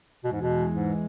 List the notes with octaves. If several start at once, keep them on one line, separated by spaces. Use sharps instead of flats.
E2 B2 E3 G#3
G#2
B2
G#2